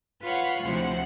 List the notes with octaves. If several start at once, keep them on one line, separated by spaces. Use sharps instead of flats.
F4 B4 C#5 F5 F#5
D2 C3 F3 E4 C5 F#5